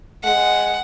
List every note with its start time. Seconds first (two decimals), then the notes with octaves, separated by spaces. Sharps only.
0.24 G#3 F#5